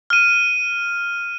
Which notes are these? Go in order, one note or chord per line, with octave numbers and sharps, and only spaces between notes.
F6 D#7